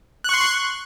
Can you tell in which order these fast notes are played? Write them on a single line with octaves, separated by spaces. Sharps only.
F#6 C#6 C6